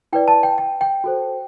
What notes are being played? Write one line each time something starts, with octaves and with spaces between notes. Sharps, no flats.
E4 B4 D5 G5
A5
G5
G5
G5
F#4 A4 C5